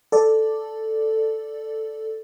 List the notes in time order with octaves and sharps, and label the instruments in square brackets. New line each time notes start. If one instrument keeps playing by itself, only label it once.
[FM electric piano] A4 D5